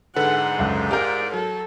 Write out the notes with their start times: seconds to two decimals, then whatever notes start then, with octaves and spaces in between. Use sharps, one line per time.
0.16 G#2 D3 A4 B4 F#5
0.59 C#2 F#2
0.91 G4 A#4 D5 F5 G6
1.34 F#3 A4